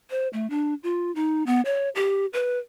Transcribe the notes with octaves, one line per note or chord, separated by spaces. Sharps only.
C5
A3
D4
F4
D#4
B3
C#5
G4
B4